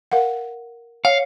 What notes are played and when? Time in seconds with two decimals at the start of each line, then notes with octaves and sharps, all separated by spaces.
0.12 A#4 F5 F#5
1.05 C#5 F5